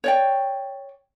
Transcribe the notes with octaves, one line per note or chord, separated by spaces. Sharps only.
C#5 D5 G5